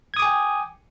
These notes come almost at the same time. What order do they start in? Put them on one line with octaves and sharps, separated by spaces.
G#6 D#6 D6 G#5 G5